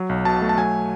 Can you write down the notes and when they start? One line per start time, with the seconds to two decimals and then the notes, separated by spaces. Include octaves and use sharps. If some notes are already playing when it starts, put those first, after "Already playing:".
Already playing: F#3
0.09 B1
0.25 B2 A5
0.42 A3
0.49 A5
0.58 F#3 G#5